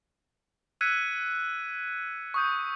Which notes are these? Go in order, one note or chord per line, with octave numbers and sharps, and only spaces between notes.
E6 F#6 G#6 B6 C#7 D#7
C#6 D#6 G6